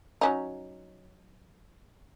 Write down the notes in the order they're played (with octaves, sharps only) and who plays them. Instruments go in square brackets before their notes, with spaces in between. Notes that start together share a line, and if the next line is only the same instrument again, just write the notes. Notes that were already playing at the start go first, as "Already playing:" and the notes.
[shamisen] F#3 C#4 D#4